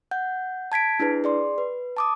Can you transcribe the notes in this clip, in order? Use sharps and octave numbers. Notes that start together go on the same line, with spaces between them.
F#5 G6
A5 G#6 B6 D7
D4 E4 G#4 B4
G#4 D5 C6
B4
A5 D6 D#6